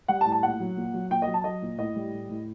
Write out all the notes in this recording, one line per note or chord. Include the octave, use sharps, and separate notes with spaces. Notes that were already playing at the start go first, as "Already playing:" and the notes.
G3 F#5
A5
A2
A5
A#2 F#5
F#3
A#2
F#3
A#2 G5
D#5
F#3
A5
F#3 D#5
A#2
A2 D#5
G3
A2
A2